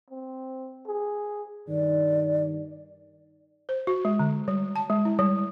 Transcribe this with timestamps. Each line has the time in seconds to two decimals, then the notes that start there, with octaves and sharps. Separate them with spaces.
0.11 C4
0.87 G#4
1.68 G2 D#3 D5
3.69 C5
3.87 F#4
4.05 G#3
4.19 D3
4.48 G3
4.76 A5
4.90 G#3
5.05 E4
5.19 G3